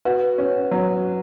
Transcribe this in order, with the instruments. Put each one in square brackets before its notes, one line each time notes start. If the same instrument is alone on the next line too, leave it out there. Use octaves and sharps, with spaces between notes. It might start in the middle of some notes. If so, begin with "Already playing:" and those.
[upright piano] F#4 [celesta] B4
[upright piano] C#4
F#3